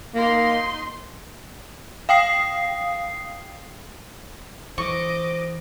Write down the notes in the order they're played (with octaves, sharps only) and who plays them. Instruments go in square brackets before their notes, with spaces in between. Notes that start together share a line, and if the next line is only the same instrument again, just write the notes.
[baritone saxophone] A#3 [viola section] D#4 C6
[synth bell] F5 G5 D#6 C7
[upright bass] E3 [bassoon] C5 [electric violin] D#5 D6 [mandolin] C#6